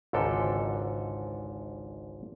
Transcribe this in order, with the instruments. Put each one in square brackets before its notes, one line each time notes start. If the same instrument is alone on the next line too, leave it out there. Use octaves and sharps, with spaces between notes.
[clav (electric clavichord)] G#1 C#2 G#2 D3 A4 G5